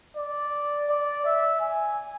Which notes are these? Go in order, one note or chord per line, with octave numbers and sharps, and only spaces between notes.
D5
D5
E5
G#5